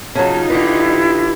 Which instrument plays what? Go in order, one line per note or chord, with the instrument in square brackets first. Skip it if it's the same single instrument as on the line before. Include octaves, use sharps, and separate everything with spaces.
[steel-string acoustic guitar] C#3 F#3 [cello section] D#4 F4 [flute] A5
[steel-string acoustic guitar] D3 G4 B4 [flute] E4